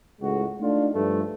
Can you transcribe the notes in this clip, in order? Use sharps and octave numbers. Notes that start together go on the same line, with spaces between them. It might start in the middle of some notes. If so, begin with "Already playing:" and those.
C#2 A2 G#3 F#4
A3 D4 D#4 F4
G2 F3 A3